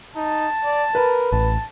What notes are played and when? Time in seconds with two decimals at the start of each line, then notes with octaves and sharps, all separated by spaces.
0.16 D#4 A5
0.64 D5
0.95 A#4 B4
1.32 A1 A5